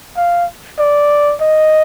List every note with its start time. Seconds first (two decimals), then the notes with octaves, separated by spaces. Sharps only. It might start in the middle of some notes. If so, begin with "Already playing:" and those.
0.17 F5
0.79 D5
1.41 D#5